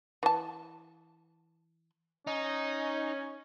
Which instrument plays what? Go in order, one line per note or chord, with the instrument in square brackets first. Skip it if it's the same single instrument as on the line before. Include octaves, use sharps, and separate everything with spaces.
[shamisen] E3 A5
[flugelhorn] C#4 [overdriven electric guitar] D#4